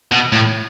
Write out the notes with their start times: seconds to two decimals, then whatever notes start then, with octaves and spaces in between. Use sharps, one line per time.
0.11 B2
0.32 A2